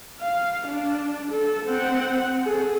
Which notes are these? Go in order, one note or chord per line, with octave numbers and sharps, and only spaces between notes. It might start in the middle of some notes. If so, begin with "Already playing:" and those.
F5
D4
A4
C4 F#5
G#4 A4